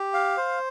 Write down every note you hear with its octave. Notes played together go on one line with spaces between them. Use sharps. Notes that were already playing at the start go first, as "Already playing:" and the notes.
Already playing: G4
F5
C5